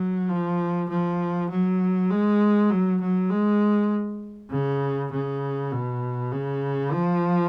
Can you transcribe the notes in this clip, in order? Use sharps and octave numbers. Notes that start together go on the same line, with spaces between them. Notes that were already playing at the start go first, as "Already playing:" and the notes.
Already playing: F#3
F3
F3
F#3
G#3
F#3
F#3
G#3
C#3
C#3
B2
C#3
F3